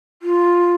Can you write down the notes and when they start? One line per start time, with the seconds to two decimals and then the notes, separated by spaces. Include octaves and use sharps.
0.22 F4